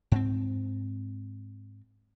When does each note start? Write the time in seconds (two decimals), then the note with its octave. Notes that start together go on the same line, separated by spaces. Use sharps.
0.12 G#2 C4